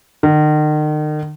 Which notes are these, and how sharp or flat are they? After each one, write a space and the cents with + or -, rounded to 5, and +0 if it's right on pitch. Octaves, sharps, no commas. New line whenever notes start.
D#3 -40